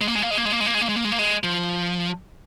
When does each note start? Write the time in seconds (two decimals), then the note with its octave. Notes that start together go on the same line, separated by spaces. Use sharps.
0.01 G#3
0.08 A#3
0.15 G#3
0.22 A#3
0.31 G#3
0.38 A#3
0.45 G#3
0.52 A#3
0.60 G#3
0.66 A#3
0.74 G#3
0.81 A#3
0.89 G#3
0.96 A#3
1.05 G#3
1.12 A#3
1.19 G#3
1.44 F3